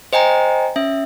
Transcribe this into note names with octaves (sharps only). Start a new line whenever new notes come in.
C5 D#5 G5 G#5 A#5
C#4 E5